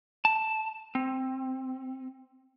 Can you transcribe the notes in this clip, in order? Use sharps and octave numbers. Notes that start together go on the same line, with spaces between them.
A5
C4